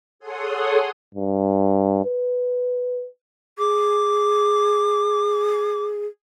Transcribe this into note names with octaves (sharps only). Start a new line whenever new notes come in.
G#4 A4 C#5 F#5 C6 D#6
G2
B4
G#4 D6